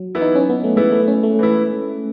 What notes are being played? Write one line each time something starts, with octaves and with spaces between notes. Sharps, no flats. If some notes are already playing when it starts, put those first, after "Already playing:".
Already playing: F#3
E3 B3 E4
D#4
C#4
B3
A3
E3 G#3 B3 E4
A3
C#4
A3
E3 B3 E4